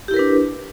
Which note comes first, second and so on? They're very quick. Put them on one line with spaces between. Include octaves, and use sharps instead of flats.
G4 E4 A#4 B4 D4